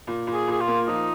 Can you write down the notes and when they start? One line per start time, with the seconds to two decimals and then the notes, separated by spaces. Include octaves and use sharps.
0.07 A#2
0.27 A#2
0.33 G#4
0.48 A#2 G#4
0.61 F4
0.67 A#3
0.87 F3 D#4